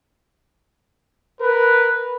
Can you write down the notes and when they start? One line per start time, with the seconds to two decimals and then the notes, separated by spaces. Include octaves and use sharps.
1.41 A#4 B4